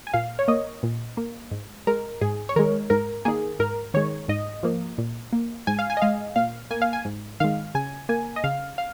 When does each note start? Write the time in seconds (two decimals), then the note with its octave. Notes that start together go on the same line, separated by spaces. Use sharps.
0.07 G#5
0.14 A#2 F5
0.39 C#5
0.48 A#3 D#5
0.83 A#2
1.17 A#3
1.51 G#2
1.87 G#3 A#4
2.21 G#2 G#4
2.49 C#5
2.56 D#3 G#3 A#4
2.90 G#2 A#4
3.25 D#3 A#3 G#4
3.59 G#2 A#4
3.94 D#3 G#3 C#5
4.28 G#2 D#5
4.63 F3 A#3
4.98 A#2
5.33 A#3
5.67 G#2 G#5
5.79 F5
5.90 G#5
5.97 D#5
6.02 G#3 F5
6.36 A#2 F5
6.71 A#3 G#5
6.82 F5
6.93 G#5
7.05 G#2
7.40 D#3 G#3 F5
7.75 C#3 G#5
8.09 A#3 G#5
8.36 D#5
8.44 C#3 F5
8.78 F5